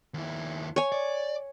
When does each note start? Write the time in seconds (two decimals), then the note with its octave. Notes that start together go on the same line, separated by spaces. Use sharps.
0.14 D#2 E4
0.76 C#5 G#5
0.92 D5